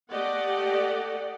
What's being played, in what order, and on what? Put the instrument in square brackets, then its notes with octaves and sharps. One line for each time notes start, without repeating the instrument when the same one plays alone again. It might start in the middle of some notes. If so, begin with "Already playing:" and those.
[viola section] A3 G4 D5 D#5 F#5